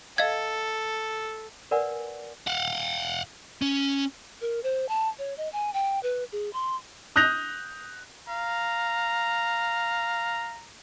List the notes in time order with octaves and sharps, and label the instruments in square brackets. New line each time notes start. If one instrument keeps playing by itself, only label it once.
[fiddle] A4 [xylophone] D#5 F5 G#6
[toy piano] A#4 B4 D5 F#5 G#5
[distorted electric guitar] F5 F#5
C#4
[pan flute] A#4
C5
A5
C#5
D#5
G#5
G5
B4
G#4
C6
[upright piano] D#6 F#6 G6 A#6 F7
[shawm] F5 [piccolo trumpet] A#5